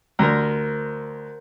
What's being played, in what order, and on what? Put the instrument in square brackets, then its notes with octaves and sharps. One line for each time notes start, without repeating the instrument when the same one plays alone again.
[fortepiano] D2 [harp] A#4 C5 A#5